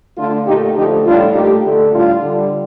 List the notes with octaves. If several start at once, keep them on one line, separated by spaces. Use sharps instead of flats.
D3 A3 D4 F4
A#2 A3 D#4 G4
D3 F3 A3 D#4 G4
A2 G3 D4 F4
A#2 A3 D#4 G4
D3 A3
A2 G3 D4 F4
D3 G3